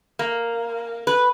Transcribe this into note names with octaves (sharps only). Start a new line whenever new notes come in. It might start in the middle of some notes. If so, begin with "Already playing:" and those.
A#3
B4